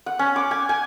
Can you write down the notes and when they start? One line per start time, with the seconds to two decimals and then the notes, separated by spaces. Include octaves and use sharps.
0.06 F#5
0.19 C#4
0.36 D6
0.51 G#5
0.69 G#5